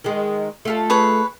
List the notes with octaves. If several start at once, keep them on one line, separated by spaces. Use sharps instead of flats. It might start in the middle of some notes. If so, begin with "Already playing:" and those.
D#3 G#3
A3 F4 A4
G#4 B4 C#5